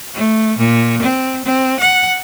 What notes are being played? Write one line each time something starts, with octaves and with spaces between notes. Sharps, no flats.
A3
A#2
C4
C4
F#5